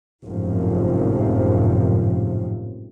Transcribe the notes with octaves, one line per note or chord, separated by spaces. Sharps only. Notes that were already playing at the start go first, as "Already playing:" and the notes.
G#1 F#2 A2 C3 F3